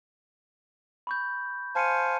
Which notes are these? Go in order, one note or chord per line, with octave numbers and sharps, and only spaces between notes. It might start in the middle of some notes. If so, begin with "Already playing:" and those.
B5 C#6 G6
C5 F5 G#5 A5 C#7 D#7